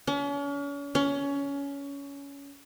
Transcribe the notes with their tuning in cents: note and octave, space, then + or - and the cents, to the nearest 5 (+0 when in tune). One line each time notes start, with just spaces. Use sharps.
C#4 +40
C#4 +20